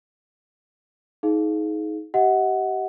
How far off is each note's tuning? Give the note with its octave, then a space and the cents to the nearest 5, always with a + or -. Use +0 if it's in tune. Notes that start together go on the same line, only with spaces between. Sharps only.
D#4 +25 G#4 +30 F5 +0
G4 -25 D#5 +40 F#5 +0